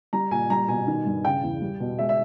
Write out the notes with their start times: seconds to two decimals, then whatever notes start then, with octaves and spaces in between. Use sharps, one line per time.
0.13 G3 A#5
0.31 A#2 G#5
0.50 G3 A#5
0.68 B2 G#5
0.87 D#3
1.06 G2
1.24 C#3 G5
1.43 E2
1.62 G3
1.80 B2
1.98 G#3 E5
2.09 E5